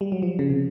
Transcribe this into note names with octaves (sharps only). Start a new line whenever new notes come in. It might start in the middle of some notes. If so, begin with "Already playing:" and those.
G3
F#3
F3
C#3
C3